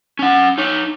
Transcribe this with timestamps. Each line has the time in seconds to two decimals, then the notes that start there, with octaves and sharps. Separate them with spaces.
0.19 C#4 F#5
0.58 D#4 C#5